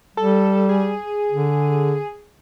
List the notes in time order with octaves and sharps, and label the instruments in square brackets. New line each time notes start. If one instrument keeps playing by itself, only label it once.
[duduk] G3 [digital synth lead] A4
[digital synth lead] G#4
[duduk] D3